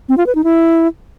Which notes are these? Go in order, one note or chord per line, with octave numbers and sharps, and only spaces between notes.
C4
F4
B4
D#4
E4